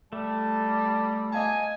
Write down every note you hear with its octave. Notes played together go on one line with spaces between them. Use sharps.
G3 A3 A5
D#5 F5 G#5 A5